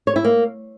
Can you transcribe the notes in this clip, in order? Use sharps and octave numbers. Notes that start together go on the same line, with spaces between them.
C#5
E4
A#3